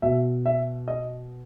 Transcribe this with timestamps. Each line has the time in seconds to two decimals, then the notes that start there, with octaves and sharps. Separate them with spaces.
0.02 B2 E5
0.46 E5
0.88 D#5